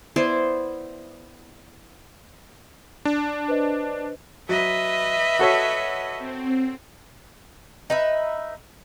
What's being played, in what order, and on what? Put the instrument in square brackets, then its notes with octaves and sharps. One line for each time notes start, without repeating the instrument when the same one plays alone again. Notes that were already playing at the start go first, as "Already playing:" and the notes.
[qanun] B3 E4 C5 D5
[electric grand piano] D4
[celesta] B4 C5 D#5
[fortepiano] F#3 [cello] B4 D#5 [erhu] E5
[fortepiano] F#4 A4 C#5
[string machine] C4
[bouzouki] D#4 B4 E5